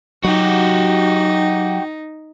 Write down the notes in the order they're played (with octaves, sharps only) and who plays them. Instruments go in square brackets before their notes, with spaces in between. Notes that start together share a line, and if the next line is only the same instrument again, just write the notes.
[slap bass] F#3 [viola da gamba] D#4 [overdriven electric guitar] F#4 G4